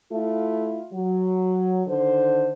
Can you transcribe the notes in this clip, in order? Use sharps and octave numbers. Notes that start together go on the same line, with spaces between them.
A3 E4 F4
F#3
D3 D#3 C5